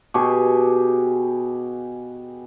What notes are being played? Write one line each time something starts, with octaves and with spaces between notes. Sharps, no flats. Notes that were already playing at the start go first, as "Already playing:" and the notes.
B2 G4 G#4 C#6